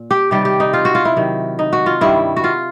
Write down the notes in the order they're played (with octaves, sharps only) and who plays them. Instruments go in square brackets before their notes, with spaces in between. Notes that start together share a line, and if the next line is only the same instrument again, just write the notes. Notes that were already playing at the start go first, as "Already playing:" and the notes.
Already playing: [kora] A#2
G4
C3 D#3 G3 G4
G4
D#4
F4
F#4
F4
E4
C3 D#3 F#3
D#4
F#4
F4
G2 D#3 G3 E4
F#4
F4